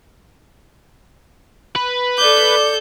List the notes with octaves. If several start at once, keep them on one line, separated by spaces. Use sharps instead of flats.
B4
A4 D5 D6 G6